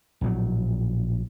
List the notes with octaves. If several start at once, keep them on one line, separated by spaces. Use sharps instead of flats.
A#1 A2 D#3 F#3